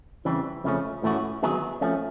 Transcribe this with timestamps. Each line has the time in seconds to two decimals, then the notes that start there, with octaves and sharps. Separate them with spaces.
0.25 E2 C#3 E3 G3 C4
0.64 F2 C#3 F3 A3 C#4
1.03 A2 E3 A3 C#4 F#4
1.43 D#3 F#3 B3 D#4 G#4
1.81 F3 A3 C#4